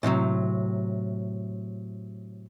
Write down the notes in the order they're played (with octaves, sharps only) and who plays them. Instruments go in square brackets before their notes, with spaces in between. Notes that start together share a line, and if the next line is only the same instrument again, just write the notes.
[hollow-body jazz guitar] A2 C3 E3 F#3